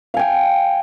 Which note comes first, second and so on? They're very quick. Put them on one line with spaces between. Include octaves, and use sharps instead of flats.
F5 G#5 G5